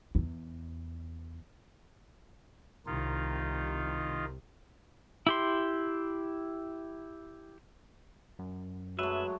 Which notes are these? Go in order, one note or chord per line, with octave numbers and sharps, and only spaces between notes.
E2
C2 C3 D#3 D#4 F4
E4 G4 C6
F#2
F#3 G#3 A3 B4 E5